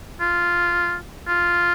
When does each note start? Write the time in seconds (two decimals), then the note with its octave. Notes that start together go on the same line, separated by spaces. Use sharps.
0.20 F4
1.28 F4